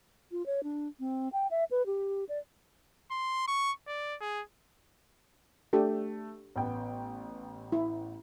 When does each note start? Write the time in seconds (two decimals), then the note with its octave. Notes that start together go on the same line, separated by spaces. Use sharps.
0.32 F4
0.46 C#5
0.63 D4
1.00 C4
1.33 G5
1.51 E5
1.71 B4
1.86 G4
2.29 D5
3.11 C6
3.48 C#6
3.88 D5
4.21 G#4
5.73 A3 D4 G4 A4
6.56 A1 B3 G5
7.72 E4